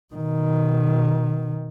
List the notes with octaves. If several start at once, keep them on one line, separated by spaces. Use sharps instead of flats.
B2 D#3